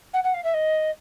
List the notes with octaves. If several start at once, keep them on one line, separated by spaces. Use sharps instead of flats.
F#5
F#5
F5
E5
D#5